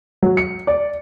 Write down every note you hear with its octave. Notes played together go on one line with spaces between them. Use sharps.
F#3
C#7
D5